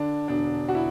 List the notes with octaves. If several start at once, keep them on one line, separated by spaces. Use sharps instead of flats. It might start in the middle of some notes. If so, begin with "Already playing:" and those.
Already playing: D3 D4
E1 D4
F#4
E4